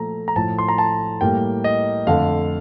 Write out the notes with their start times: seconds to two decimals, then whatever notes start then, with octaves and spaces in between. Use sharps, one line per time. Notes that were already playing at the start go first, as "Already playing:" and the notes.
Already playing: A#2 F3 A3 A#5
0.28 A#5
0.36 A2 F3 A3 A5
0.59 C6
0.68 A#5
0.78 A5
1.21 A2 G3 A#3 G5
1.64 D#5
2.07 F2 D3 A3 F5